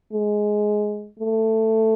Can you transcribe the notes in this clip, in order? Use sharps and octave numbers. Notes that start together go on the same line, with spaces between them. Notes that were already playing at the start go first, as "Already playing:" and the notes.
G#3
A3